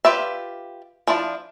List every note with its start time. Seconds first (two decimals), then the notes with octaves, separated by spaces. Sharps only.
0.05 F4 G4 B4 D5 E5
1.07 F3 D4 E4 D5